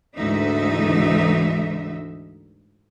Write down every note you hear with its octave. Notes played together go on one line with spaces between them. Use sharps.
D2 G#2 D3 E3 D#4 E5